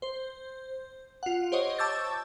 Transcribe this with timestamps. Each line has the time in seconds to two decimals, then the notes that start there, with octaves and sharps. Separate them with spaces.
0.02 C5
1.23 F4 F#5
1.52 G4 C5 C#5 D#5
1.79 A5 C#6 D6 E6 G6 A6